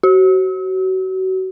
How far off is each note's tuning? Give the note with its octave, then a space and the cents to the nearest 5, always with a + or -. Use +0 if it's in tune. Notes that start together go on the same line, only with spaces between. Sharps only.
F#4 +30